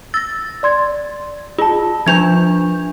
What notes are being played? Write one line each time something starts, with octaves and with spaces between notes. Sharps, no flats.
E6 A6 A#6
D5 C6 G#6
F4 G#4 A5
F3 D4 G6 G#6 F7